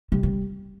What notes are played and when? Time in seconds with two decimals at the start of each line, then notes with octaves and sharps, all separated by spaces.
0.12 C#3 G3
0.23 C#3